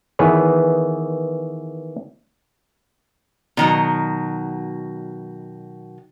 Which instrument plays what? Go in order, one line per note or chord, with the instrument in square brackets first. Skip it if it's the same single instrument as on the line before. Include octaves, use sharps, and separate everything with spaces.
[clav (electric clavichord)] D#3 E3 B3 G#4 B4 C#5
[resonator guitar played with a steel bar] B2 D#3 F#3